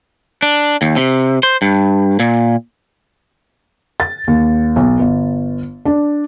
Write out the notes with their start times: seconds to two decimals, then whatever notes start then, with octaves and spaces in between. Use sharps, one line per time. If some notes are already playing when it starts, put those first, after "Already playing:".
0.42 D4
0.82 D#2
0.96 C3
1.43 C5
1.62 G2
2.20 A#2
4.00 A6
4.27 D#2
4.76 B1
5.00 G1
5.85 D4